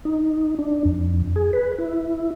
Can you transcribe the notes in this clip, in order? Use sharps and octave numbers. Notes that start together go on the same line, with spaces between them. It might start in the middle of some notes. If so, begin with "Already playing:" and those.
D#4
D4
F2
G#4
B4
E4